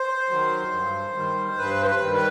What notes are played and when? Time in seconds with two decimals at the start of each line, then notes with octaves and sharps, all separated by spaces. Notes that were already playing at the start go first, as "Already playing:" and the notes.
Already playing: C5
0.29 D#3 F#3
0.72 G2
1.15 D#3 G3
1.58 G2 B4
1.82 C5
1.86 B4
2.01 D#3 G3
2.15 B4